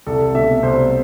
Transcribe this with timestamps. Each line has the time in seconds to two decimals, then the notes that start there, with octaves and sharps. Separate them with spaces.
0.06 C2 A4
0.34 B2 A3 D4 E5
0.63 C2 C5